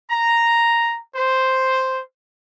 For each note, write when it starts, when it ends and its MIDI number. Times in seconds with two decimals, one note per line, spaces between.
0.11 1.00 82
1.16 2.01 72